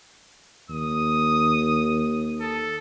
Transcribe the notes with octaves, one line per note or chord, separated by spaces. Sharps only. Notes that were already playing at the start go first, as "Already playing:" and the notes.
D#2 D#6
A4